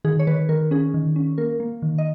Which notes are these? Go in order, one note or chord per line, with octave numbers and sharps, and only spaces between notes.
D#3 G#4
C#5
D#3 B4
D#3 A#4
C#4 G#4
D#3
C#4
A#3 A#4
A#3
D#3
D#5